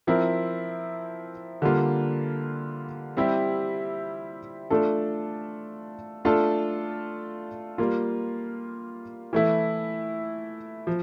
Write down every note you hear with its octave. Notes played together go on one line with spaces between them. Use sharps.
F3 C4 E4 A#4
D3 G3 A#3 F4
G3 C4 E4 G4
A3 D4 F4 A4
A3 D4 F4 A4
G3 A#3 F4
E3 A3 E4
F3